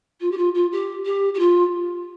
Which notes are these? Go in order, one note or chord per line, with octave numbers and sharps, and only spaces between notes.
F4
G4
F4
F4
G4
G4
G4
F4